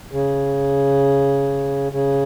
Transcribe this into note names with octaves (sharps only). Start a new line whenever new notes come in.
C#3
C#3